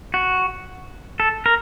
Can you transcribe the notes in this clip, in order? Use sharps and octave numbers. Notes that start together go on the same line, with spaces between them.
F#4
A4
A#4